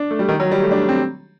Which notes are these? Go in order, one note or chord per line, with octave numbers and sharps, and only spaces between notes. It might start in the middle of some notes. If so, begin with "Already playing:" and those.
Already playing: D4
A3
G3
D#3
F#3
G3
A3
D4
C4